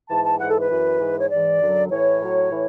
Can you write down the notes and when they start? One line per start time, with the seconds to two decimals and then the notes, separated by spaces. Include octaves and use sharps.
0.09 G#2 E3 A5
0.24 A5
0.39 G#2 E3 F#5
0.49 A4
0.59 B4
0.70 F#2 E3
1.00 G#2 E3
1.19 C#5
1.30 G#2 E3 D5
1.61 F#2 D3 F#3
1.90 A2 E3 C#5
2.21 A2 F#3
2.51 A2 E3